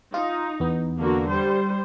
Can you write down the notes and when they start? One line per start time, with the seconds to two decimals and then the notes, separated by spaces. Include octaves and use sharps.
0.14 D#4 F4
0.60 E2 B3
1.00 D3 A#3 F#4
1.29 G3 C5